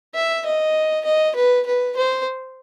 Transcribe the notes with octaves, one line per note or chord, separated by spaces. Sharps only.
E5
D#5
D#5
B4
B4
C5